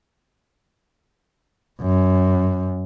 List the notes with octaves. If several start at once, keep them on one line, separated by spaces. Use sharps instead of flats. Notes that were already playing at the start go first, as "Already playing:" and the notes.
F#2